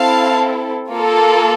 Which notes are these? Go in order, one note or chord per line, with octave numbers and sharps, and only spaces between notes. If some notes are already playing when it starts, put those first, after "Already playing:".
Already playing: C4 E4 A4 F5 A5
A#3 F4 A4